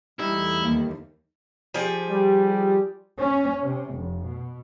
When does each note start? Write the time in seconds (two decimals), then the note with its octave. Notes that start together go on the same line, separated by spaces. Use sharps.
0.19 E2 G3 A3 D#4 E4
0.62 D#2
1.74 F3 G4 G#4
2.10 G3
3.18 C#4
3.63 C3
3.93 F1
4.27 B2